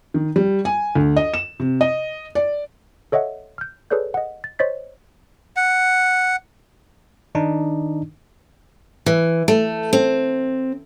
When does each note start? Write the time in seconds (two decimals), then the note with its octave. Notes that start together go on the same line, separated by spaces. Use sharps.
0.14 D#3
0.36 G3
0.65 G#5
0.95 D2
1.16 D#5
1.34 E7
1.60 C3
1.81 D#5
2.35 D5
3.12 A4 C#5 D#5 E5 F#5
3.58 F6 G6
3.90 G#4 A4 B4 C#5 D5 G6
4.14 D#5 F#5
4.44 A6
4.59 C5 C#5 D#5 A6 B6
5.56 F#5
7.35 D#3 D4 D#4
9.06 E3
9.48 A3
9.93 C4